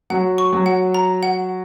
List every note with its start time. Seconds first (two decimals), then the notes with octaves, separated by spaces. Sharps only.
0.10 F#3 F#5
0.38 C#6
0.53 F#3
0.66 F#5
0.94 A#5
1.23 F#5